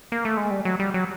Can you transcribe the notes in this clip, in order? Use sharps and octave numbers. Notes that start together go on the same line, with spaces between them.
A#3
A3
G#3
G3
F#3
G3
F#3